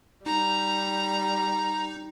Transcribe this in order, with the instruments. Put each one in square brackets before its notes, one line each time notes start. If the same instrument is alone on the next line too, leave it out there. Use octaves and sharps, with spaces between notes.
[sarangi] G3 [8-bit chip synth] D#4 [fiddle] A#5